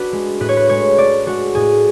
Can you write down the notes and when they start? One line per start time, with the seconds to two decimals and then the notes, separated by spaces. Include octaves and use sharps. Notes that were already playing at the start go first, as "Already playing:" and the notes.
Already playing: D4 F#4 B4
0.12 G#3
0.40 A2 B4
0.49 C#5
0.57 B4
0.69 G#3 C#5
0.98 D4 D5
1.26 G#3 F#4
1.55 A2 G#4